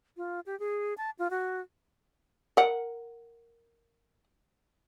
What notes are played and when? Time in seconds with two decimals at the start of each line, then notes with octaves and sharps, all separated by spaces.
0.17 F4
0.46 G4
0.60 G#4
0.98 A5
1.19 F4
1.30 F#4
2.57 A#4 F#5